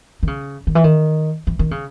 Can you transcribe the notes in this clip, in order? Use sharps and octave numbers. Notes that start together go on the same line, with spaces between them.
D#3
C#3
D#3
E3
D#3
E3
D#3
C#3